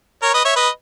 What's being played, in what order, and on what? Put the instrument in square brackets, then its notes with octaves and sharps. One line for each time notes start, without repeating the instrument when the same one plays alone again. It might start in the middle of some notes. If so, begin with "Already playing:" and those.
[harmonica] A#4 C#5
B4 D#5
C#5 E5
B4 D#5